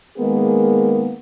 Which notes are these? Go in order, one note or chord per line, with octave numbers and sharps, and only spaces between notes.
D#3 G#3 A#3 B3 G#4 A#4